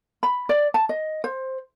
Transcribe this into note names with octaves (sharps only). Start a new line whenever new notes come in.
B5
D5
A5
D#5
C5